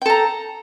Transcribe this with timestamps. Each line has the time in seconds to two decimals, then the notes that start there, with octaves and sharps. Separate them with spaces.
0.02 G5
0.06 A4
0.10 A#5